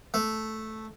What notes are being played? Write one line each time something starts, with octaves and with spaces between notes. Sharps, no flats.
A3